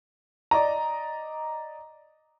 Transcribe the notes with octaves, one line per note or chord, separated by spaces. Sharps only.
D5 D#5 A#5